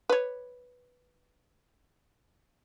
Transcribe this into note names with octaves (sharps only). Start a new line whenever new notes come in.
B4 C#5